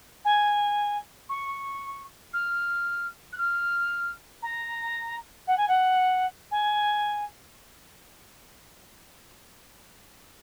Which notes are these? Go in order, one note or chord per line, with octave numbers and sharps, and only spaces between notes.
G#5
C#6
F6
F#6
F6
A#5
F#5
G#5
F#5
G#5